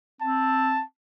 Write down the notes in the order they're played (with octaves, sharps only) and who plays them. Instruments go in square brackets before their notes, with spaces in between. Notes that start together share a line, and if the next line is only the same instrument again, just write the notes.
[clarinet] C4 [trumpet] A5